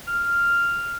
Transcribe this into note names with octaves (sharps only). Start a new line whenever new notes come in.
F6